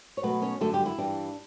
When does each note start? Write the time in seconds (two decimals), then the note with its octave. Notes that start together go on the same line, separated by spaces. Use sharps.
0.17 C#5
0.23 B2 F#3 A3 B3 B4
0.42 C#4 C#5
0.61 F#2 D3 F#3 A3 A4
0.73 G3 G4
0.86 E4
0.98 G2 E3 G3 D4